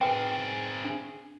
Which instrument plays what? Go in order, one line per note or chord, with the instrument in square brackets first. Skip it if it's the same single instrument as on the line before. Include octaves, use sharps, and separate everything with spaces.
[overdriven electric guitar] C4 G#4 [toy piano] B4 G5
[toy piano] D4